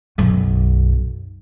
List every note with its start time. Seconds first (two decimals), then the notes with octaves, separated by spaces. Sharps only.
0.18 B1 F#2